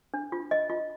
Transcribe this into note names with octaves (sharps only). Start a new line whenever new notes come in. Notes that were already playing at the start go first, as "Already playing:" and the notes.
D4
F4
D#5
F4